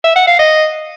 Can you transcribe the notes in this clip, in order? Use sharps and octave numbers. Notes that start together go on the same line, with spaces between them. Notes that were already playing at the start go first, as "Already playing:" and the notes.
E5
F#5
F5
D#5